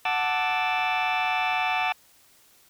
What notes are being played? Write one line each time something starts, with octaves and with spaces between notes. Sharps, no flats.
F#5 A5 D6 E6